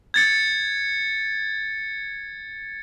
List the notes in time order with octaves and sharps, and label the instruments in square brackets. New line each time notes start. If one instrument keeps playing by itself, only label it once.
[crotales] G#6 A6 C#7